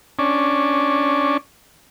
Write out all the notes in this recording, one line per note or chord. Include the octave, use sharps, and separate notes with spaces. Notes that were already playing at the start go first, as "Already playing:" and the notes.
C#4 D4